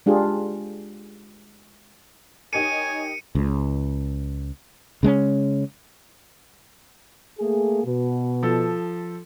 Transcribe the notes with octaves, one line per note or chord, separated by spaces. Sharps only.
G#3 D4 F4 G4 G#4
D#4 G4 A#4 C#5 G#5 C#7 D#7
C#2
C#3 G#3 C4 C#4
A3 A#3 G#4
B2
F3 A4